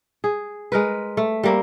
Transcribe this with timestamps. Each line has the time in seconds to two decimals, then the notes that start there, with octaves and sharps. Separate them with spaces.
0.24 G#4
0.72 G#3 A#4 B4
1.17 A3
1.43 G3 A#3 C4